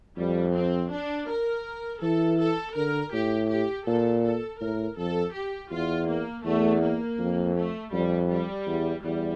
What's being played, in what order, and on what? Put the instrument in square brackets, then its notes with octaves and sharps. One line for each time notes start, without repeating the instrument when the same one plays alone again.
[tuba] F2 [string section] G3
[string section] C4
D4
A#4
[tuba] E3 [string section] A4
[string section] A4
[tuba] D3 [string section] A#4
[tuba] A2 [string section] G4
[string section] G4
[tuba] A#2 [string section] A4
[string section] A4
[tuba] A2 [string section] A#4
[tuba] F2 [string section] A4
[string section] G4
[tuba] E2 [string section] F4
[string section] A#3
[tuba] E2 [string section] A3
[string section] A#3
[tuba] F2
[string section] A3
[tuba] F2 [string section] G3
[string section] G3
[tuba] E2
[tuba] E2 [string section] G3